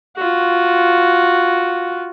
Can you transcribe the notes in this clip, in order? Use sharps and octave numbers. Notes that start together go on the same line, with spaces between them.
F4 F#4